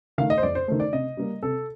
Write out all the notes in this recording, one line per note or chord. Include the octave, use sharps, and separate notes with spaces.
D#3 A3 F5
D#5
C5
F2 D5
C5
D#3 A3 C5
D5
C3 D#5
G3 A#3
C3 A4